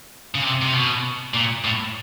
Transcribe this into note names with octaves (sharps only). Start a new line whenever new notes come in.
C#3
C3
C3
B2
A#2
A2